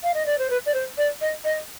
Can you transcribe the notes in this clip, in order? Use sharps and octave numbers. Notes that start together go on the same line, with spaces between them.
F5
D#5
D5
C5
B4
D5
C5
D5
D#5
D#5